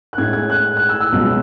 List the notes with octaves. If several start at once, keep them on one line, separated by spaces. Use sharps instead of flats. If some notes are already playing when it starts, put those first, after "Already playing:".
F#6
A2 G#3 G#6
G#6
F#6
F#6
E6
E6
C#2 B2 F#3